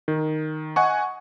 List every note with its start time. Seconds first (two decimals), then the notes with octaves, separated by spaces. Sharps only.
0.08 D#3
0.76 D#5 F#5 G#5 C#6